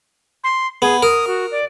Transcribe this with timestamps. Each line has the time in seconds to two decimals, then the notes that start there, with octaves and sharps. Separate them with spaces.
0.44 C6
0.82 B3 G#4
1.02 A#4 D#6
1.27 F#4
1.51 D5